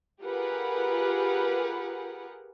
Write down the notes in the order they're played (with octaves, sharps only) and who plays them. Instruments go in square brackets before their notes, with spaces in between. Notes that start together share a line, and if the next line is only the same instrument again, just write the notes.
[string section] F4 G4 G#4 A#4 B4 F#5